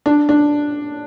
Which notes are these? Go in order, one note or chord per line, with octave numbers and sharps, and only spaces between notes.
D4
D4